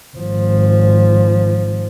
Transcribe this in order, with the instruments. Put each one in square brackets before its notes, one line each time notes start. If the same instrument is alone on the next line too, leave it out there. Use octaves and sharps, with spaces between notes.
[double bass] G#1 F3